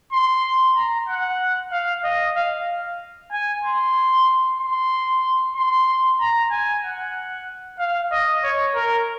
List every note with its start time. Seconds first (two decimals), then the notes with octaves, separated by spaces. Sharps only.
0.12 C6
0.76 A#5
1.09 F#5
1.72 F5
2.04 D#5
2.36 F5
3.32 G#5
3.64 C6
4.60 C6
5.56 C6
6.20 A#5
6.51 G#5
6.83 F#5
7.79 F5
8.12 D#5
8.44 C#5
8.75 A#4